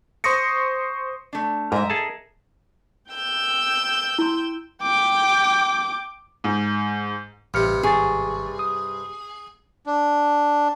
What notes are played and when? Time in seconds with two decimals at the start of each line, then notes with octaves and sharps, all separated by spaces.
0.24 C5 C6 C#6 D#6 A#6 C#7
1.33 A3 D4
1.72 G#2 A#4 D#5 E5
1.90 G#4 A4 A5
3.10 G5 E6 G6
4.19 E4 C6
4.83 G5 D6
6.44 G#2
7.54 A1 G2 C3 F6 C#7
7.83 G#1 G#4 C#6 A6
8.59 D#6
9.86 D4